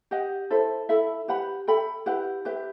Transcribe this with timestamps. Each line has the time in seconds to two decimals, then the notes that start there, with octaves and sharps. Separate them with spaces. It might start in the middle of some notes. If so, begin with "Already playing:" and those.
0.11 G4 D#5 F#5
0.50 E4 A4 C5
0.89 E4 A4 E5 B5
1.28 G4 B4 F#5 B5
1.67 A4 E5 G5 B5
2.06 E4 G4 B4 F#5
2.45 G4 B4 E5